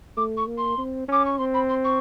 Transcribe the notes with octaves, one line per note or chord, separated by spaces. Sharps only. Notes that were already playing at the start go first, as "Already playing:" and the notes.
A3 D6
C#6
A#3
C6
C4
C#4 D6
C#6
C4 C6
B5
C6
C#6